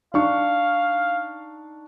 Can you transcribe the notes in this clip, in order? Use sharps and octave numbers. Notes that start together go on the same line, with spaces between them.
D4 D#4 F5 C#6